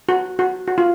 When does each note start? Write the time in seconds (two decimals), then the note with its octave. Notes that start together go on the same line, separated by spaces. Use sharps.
0.09 F#4
0.39 F#4
0.67 F#4
0.78 F4